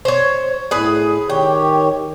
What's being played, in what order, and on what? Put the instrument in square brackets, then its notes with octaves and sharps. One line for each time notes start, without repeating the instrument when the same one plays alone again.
[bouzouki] C5 C#5
[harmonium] A2 [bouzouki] G#4 B4
[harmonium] D#3 G4 C#5 [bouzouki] G5